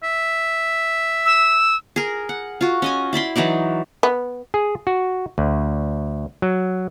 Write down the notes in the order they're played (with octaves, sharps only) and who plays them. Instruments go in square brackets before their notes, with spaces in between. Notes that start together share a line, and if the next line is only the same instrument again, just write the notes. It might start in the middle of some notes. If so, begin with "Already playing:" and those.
[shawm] E5
[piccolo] E6
[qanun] G#4 A#4
F#5
F4 F#4
C#4 D#5 G#5
E4 D5 B5 C6
E3 F#3 D#4 D5
[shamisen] B3
[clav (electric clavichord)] G#4
F#4
D2
F#3